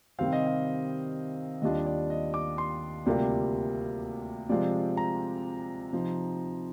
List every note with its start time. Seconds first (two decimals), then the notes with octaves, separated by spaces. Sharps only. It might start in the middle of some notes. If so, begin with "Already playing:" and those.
0.19 C3 D#3 G3 C4 F5
0.33 D#5
0.46 F5
1.62 D#2 D#3 G3 D4 F4 D#5
1.79 D#5
1.86 D5
2.10 D#5
2.34 D6
2.58 C6
3.06 D2 C3 G3 A#3 F4 D5
4.49 C3 F3 G#3 C4 F4 D5
4.97 A#5
5.93 C3 F3 C4 D#4